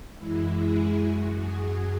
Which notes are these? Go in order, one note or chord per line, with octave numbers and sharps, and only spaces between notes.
F#2 E3 G#3 E4
G#4
F#2 F#3
G#4